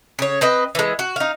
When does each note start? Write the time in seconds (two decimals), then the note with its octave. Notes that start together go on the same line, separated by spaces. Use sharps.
0.19 C#3 C#5
0.41 C4 B4 D#5
0.75 E3 G#3
0.99 F#4
1.16 D#4 F5